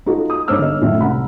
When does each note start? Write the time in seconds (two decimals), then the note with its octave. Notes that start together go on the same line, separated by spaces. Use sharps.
0.06 D#4 F4 F#4 A4
0.30 D#6
0.48 G2 D#4 C#5 D6 E6 F6
0.59 G1 D#5
0.81 F#2 A2 D3 D#3 E5
1.00 C2 F#5 A#5 B5